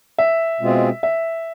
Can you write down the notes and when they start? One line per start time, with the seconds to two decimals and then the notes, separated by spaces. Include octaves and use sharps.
0.18 E5
0.61 B2 G#3 C4 F4 G#4
1.03 E5